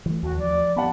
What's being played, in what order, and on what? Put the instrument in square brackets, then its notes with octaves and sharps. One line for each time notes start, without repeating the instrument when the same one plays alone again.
[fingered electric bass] E3 F3 A3
[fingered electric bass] D#2 [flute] F#4
[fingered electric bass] F3 [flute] D5
[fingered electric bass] B3 [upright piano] F#5 A5 B5